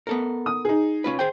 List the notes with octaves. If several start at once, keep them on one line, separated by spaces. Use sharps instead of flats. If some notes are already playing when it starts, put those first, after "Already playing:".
B3 A4 A#4
D#6
D#4 G#4
C#4 F4 B4
G#4 C5 G5